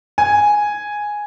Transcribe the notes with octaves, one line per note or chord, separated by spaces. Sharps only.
G#5